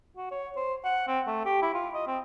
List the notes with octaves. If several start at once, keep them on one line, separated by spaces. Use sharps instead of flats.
F#4
C#5
C5
F#5
C4
A3
G4
E4
F4
D#5
C4